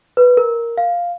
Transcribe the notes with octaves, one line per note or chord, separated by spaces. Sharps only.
B4
A#4
F5